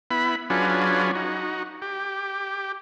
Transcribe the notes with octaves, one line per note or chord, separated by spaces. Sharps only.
B3 E4 B5
F#3 C#4 D4 F4 G#4 B4
D#4 F#4
G4